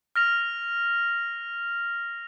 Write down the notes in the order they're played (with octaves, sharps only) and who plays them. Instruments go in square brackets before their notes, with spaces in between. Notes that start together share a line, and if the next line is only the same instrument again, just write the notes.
[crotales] F6 A#6 F7